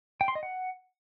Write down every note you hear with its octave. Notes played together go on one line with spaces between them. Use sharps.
G5
C6
D#5
F#5